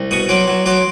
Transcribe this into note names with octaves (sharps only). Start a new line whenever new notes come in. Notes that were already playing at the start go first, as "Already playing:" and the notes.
Already playing: C2
B2 C#6 D#6
F#3 C6 D6
F#3
F#3 C6 D6